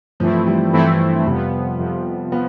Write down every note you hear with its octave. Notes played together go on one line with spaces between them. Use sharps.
G2 E3 F3 A3 C4 E4
G3
G2 E3 A3 C4 E4
F2 C3 F3 G3 B3
F2 C3 F3 B3
F3 B3